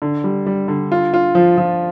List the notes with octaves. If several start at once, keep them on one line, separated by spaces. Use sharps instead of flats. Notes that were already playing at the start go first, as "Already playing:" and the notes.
D3
G3
G3
D3
F4
F4
F3
F3